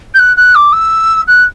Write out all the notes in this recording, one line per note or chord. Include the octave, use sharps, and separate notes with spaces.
G6
F#6
F#6
D6
E6
F#6